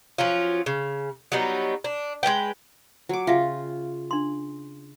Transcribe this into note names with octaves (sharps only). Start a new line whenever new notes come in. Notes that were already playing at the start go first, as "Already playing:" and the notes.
F3 F#3 C#4 F4
C#3
F#3 G3 B3 D#4
D4
G#3 B3 B4 G5
F#3 D6
C#3 F4 E5 F5 G5
D4 C6